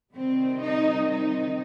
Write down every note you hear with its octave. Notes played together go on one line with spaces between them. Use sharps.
C3 D#3 G3 C4
D#4
D#4